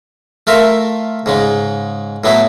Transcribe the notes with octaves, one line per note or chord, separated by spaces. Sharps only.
A3 F4 A#4 E5
G#2 C#3 G#3
A2 F#3 B3 E4